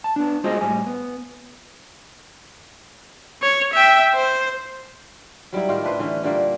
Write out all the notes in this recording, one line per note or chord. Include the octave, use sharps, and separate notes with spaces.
A5
B3 D4
G#3 F4 F#4 G#4 C5 D#5
A2 G3 G#5
B3
C#5
E5 G5
C5
F#3 G3 D#4 E4
A2 D#3 F4 G4
D4 E4 B4 C5
D3 E3 C#4
A#2 D3 G3 A#3